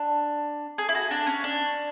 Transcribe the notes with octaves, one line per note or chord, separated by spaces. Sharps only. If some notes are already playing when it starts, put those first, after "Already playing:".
Already playing: D4
G#4
E4
F#4
D4
C#4
D4